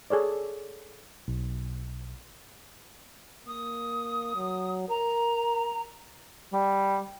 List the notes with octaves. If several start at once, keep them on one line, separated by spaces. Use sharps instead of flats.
G#4 A4 C#5 D5
B1
A#3 D#6
F#3
A#4 A#5
G3